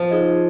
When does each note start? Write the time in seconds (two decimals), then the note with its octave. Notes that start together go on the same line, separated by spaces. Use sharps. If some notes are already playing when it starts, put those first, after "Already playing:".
Already playing: F3
0.10 D#4 G#4 D#5